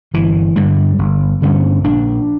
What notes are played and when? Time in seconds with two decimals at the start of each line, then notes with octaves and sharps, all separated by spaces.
0.14 G1 E3
0.56 G2 D3 G3
0.99 G1
1.42 G2 D3 C#4
1.84 A#1 D4